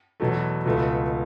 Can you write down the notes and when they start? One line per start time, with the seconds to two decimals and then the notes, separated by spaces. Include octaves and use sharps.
0.20 E2 B2 F#3 A3
0.65 C#2 B2 A3